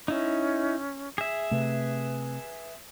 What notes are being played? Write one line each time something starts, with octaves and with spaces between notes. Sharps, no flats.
C#4 D#4 E4
G#4 E5
C3 A3 B4